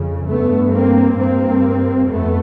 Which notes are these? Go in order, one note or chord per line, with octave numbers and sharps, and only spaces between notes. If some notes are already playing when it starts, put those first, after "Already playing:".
Already playing: F2 C#3
G2 A3 B3
A#3 C4
G2 A#3 C4
F2 A3 B3